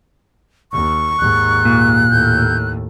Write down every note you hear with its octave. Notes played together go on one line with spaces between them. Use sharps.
D#2 C#6
D#2 G#2 F#6
A#2
D#2 A2 G6